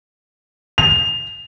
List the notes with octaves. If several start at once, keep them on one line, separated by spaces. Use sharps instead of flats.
F7